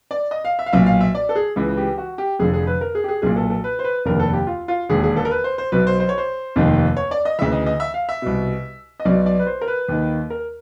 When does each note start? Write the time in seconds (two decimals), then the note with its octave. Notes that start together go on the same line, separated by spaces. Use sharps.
0.11 D5
0.31 D#5
0.45 F5
0.59 E5
0.66 F5
0.73 B1 A#2 E5
0.86 F5
1.01 E5
1.15 D5
1.29 A4
1.36 G#4
1.56 C#2 C#3 E3
1.77 G4
1.98 F#4
2.18 G4
2.39 F1 F2 D3 G#4
2.53 G#4
2.67 B4
2.81 A#4
2.95 G#4
3.04 G4
3.08 G#4
3.22 B1 A#2 G#4
3.36 A4
3.50 A4
3.64 B4
3.79 C5
3.84 B4
4.05 F1 D#2 D3 A#4
4.19 A4
4.33 G4
4.47 F4
4.68 F4
4.89 E1 D#2 D3 G#4
5.03 G#4
5.17 A4
5.25 A#4
5.31 B4
5.44 C5
5.58 C5
5.72 B1 B2 B4
5.87 C5
6.00 C5
6.09 C#5
6.18 C5
6.56 F1 D#2 D#3
6.97 C#5
7.11 D5
7.25 D#5
7.39 D2 C#3 E3 E5
7.52 D#5
7.66 D#5
7.80 E5
7.94 F5
8.09 E5
8.22 C2 B2
9.00 D#5
9.05 B1 B2 D5
9.26 D5
9.39 B4
9.47 C5
9.61 A#4
9.68 B4
9.88 D#2 D#3
10.30 A#4